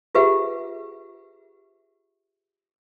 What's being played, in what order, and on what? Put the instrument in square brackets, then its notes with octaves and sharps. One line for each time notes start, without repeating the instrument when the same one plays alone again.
[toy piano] F4 G4 G#4 B4 E5 F#5